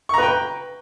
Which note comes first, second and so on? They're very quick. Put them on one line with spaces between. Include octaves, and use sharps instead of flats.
C#6 A#5 B4 G5